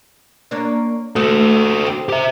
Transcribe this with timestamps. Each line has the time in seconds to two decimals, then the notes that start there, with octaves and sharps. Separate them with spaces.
0.51 A#3 C#4 D4
1.16 A3 F#4 A4
1.87 C4
2.09 G4 E5